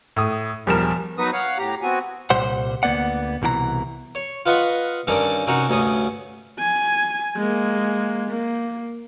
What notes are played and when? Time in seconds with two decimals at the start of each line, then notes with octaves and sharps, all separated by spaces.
0.16 A2 D#6
0.66 E1 E2 F3 G3 A#4 E7
1.18 F#3 B3 D#4 F#4 B4 D#6
1.33 C#5 F5 F#5
1.59 A2 G4 A#5
1.82 B3 C4 F#4 G#5
2.30 C2 A#2 G3 C5 F#5
2.83 D2 C#3 A#3 B3 D5 F#5
3.42 C2 B2 E3 G4 A#5
4.15 C#5
4.46 F4 B4 D#5 F#5 B5 C#6
5.07 G2 D3 D#3 C#4 D5 D6
5.47 C3 C#4 D#4 F#4
5.69 D2 G2 C#4 D#6
6.59 G#5
7.36 G#3 A#3
8.30 A#3